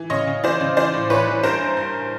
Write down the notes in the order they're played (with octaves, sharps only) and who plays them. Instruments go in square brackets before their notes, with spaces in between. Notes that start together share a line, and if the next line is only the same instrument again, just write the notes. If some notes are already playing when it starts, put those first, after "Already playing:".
Already playing: [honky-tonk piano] E3
C#3 C#5 D#5
C#3
E3 C5 D5
C#3
E3 C5 D5
A2
E3 B4 C#5
E3
G2 A#4 C5
G2
G2